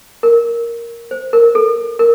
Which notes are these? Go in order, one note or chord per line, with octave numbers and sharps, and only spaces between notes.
A#4
C5
A#4
A4
A#4